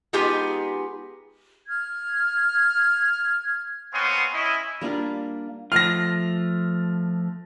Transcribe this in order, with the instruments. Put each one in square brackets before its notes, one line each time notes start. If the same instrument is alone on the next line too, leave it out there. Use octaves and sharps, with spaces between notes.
[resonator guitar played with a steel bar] G#3 B3 D#4 F4 G4 G#4
[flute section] F6 G#6
[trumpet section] B3 C4 C#5 F5 G#5 C6
C#4 E4 D#5
[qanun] G3 A#3 D4 F4
[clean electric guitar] F3 A3 F4 [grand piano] F6 A#6